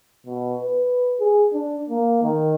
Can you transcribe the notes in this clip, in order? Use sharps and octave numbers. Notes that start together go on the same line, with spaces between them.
B2
B4
G#4
D4
A#3
D#3